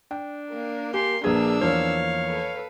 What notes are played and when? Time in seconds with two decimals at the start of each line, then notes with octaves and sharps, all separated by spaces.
0.11 D4 G5
0.50 A#3 A#4
0.94 G4 G#5 C6
1.24 A#1 A#3 D4 G#4 B4 E6 G#6
1.61 E2 F3 A#3 C#5 F5
2.26 A4 B4